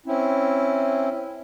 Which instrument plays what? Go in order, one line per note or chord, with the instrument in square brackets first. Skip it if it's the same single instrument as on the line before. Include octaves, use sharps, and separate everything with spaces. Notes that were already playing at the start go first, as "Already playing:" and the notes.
[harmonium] C4 C#4 E4